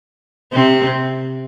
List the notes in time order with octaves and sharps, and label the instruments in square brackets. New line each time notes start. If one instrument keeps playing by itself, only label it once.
[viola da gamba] C3 C4